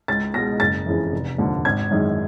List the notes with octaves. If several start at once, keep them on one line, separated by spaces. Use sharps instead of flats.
C#2 A6
B2 G#3 A#6
F#1 A6
F2 C#3 E3
F1
D#2 D3 F3
G#1 G#6
F#2 D#3 G#3